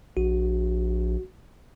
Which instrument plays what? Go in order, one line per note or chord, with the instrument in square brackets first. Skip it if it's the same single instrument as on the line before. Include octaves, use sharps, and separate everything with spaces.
[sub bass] A#1 [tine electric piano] F#4